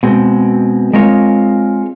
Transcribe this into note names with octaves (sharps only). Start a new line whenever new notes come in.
B2 G#3 C4
G#3 C4 F4 A#4 C#5